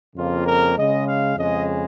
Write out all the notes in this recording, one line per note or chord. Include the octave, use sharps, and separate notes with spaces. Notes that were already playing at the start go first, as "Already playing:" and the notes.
F2 C#3 A#3 F4
A#4
C#3 G#3 D#5
F5
F2 C#3 G#3 D#5